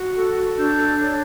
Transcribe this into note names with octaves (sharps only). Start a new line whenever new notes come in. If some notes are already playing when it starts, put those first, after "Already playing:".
Already playing: F#4
A4
D4 G6
C#5